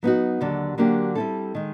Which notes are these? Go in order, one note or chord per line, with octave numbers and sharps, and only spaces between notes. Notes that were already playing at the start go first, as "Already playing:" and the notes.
F#3 B3 D#4 F#4
D#2 D3 F#3
D3 F#3 A#3 D4 G4
G3 C4 E4 A4
D#3 G#3